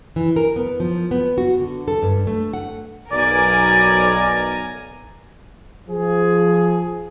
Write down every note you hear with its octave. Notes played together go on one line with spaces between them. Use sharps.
E3
A#4
B3
F3
B3
F#4
D3
A4
G2
A3
F#5
B1 A#4 D5 G#5
F3 G#4